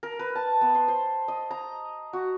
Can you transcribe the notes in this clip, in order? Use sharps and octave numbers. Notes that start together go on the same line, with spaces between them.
A#4
B4
A5
B3
C6
C5
D#5
A#5
F#4